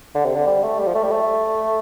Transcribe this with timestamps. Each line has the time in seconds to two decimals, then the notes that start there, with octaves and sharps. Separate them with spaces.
0.15 D3
0.26 C3
0.36 D3
0.47 G3
0.63 A3
0.79 G3
0.87 F3
0.95 A3
1.03 G3
1.11 A3